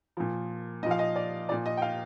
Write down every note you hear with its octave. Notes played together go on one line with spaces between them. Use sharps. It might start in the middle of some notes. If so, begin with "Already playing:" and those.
A#2 F3
A#2 F3 D#5 F5
D#5
D5
A#2 F3 D5
D#5
G5
F5